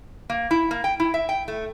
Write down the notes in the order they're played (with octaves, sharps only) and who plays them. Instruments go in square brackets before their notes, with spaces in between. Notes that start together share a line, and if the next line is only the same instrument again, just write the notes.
[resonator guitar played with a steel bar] A#3
E4
A#3
G5
E4
E5
G5
A3